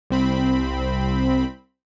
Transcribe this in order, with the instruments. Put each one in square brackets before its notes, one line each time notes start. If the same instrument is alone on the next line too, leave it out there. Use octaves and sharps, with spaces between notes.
[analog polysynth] C2 C4 B5